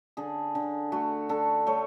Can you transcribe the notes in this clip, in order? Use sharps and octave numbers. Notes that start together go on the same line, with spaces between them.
D3 G#4
D3
A3 F#4
D3 A4
A3 C#5